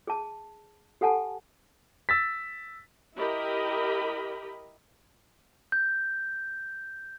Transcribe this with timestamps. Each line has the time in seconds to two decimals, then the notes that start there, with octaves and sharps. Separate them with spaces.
0.07 G#4 A5
1.01 G4 A4 F#5 G#5 A5
2.09 E6 A6 B6
3.16 E4 G4 A#4 D#5 B5
5.72 G6